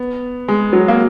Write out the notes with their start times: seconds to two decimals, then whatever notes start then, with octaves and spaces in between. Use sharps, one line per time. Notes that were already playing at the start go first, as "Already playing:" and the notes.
Already playing: B3
0.48 G#3
0.73 F#3
0.88 A#3